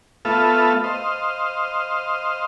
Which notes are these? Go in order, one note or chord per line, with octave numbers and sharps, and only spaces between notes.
A3 B3 F4 A4 E5 F5
C5 D#5 F5